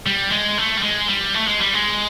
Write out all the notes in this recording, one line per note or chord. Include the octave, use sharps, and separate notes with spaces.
G3
G#3
A3
G3
G#3
G3
A3
G#3
G3
G#3